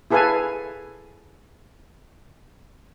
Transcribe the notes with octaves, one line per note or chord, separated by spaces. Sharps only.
E4 G#4 A4 B4 F5 G#5